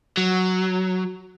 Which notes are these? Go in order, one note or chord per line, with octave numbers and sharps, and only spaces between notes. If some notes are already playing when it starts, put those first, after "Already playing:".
F#3